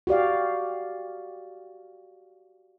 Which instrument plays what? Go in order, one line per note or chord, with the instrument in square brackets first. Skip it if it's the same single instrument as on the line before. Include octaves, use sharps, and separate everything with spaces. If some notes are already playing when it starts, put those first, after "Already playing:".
[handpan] F#4 G4 D5 F5